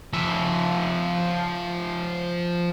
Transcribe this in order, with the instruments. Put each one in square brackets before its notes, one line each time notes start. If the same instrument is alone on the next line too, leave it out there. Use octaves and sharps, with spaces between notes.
[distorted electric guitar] F3 E5